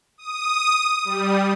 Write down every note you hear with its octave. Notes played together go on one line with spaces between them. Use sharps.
D#6
G3